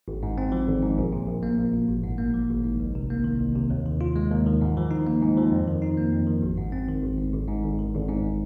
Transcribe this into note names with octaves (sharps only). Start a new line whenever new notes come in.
G#1
G#2
C4
F3
G#1
G#2
A#1
A#2
A#1
A#3
A#1
A#2
G#1
G#2
A#3
F3
G#1
G#2
C2
C3
A#3
D#3
C2
C3
D#2
D#3
F4
G#3
D#2
D#3
G#2
F3
D#4
A#3
G#2
F3
F2
D#3
D#4
A#3
F2
D#3
G#1
G#2
C4
D#3
G#1
G#2
G#1
G#2
G#1
D#3
G#1
G#2